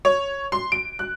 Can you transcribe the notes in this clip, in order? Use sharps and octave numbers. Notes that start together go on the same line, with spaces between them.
C#5
C6
D7
F#6